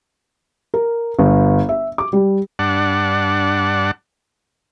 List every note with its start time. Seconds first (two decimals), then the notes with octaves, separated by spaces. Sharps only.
0.74 A#4
1.19 G1
1.69 E5
1.98 D6
2.13 G3
2.59 G2 D4 F#5